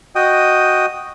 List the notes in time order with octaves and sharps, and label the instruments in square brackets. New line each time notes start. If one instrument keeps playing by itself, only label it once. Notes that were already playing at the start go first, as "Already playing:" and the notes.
[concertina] F#4 D#5 G5 D#6